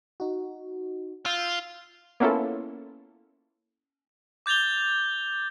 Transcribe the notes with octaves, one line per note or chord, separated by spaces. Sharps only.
D#4 F#4
F4 E6 G6
A#3 B3 C#4 E4 F4 A4
D6 G6 A6 F7 G7